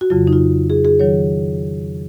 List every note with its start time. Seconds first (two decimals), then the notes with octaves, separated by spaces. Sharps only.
0.01 F#4
0.10 F2 C#3 F#3 F4
0.27 D#4
0.33 F4
0.70 G#4
0.85 G#4
1.00 D#3 F#3 C#5